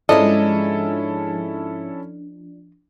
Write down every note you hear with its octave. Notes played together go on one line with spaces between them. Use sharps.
G#2 F3 G#3 C#4 D4 E4 A4 D#5